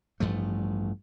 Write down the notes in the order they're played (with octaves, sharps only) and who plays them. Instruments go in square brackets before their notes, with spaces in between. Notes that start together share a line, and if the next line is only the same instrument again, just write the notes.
[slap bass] A1 G2 F3 A3